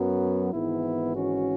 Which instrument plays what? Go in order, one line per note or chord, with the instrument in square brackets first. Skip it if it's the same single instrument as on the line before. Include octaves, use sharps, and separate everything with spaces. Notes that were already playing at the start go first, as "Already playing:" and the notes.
Already playing: [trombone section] F#2 F#3 B3
G#1 G#2 E3 B3 E4
C#4 F#4